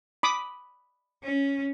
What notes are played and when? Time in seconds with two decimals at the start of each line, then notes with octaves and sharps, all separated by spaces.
0.23 B5 D6 D#6
1.23 C#4